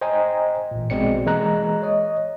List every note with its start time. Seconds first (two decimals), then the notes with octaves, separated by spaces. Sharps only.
0.01 C5 D#5 G5 G#5 A#5
0.71 A1 A#2
0.90 A#1 B2 G#3 C4 D5 C#7
1.26 E3 G#3 A#3 A#5 F#6
1.82 C#5 D#5